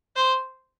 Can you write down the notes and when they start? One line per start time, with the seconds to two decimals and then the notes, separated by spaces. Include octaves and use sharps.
0.16 C5